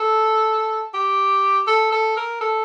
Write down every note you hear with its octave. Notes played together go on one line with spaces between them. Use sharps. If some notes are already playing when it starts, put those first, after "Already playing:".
Already playing: A4
G4
A4
A4
A#4
A4